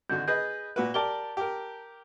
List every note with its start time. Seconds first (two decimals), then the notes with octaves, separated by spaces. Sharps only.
0.10 G#1 D3 F#4 G6
0.28 G#4 B4 D#5 G6
0.76 A#2 F#4 B4
0.94 G4 A#4 D5 A5 G7
1.37 G4 A#4